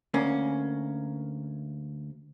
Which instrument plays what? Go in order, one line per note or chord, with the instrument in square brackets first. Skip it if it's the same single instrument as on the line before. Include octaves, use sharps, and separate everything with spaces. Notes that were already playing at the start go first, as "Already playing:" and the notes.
[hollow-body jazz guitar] D2 A#3 C#4